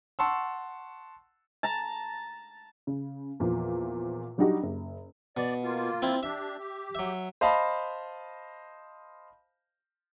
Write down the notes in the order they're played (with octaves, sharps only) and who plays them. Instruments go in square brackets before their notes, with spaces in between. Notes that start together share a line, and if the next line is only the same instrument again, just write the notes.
[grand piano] F#5 A5 C6 C#6 E6
[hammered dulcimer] A5 A#5
[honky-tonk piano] C#3
E2 A#2 F3
F#3 G3 D4 D#4 F#4 G4
F#1
[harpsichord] B2 [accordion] D5
[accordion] A#3 F4
[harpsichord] C4 E4
[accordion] D4 G4 [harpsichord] E5
[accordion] G4
[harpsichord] F#3 E5
[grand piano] C5 D#5 F5 A5 B5